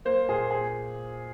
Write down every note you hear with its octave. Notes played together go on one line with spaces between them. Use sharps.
A#3 C5
A#2 G#4
G#4